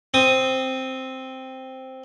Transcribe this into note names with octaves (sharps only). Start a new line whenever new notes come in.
C4 D#6